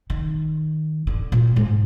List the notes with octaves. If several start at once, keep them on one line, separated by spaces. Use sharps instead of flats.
D#3
D3
A#2
G#2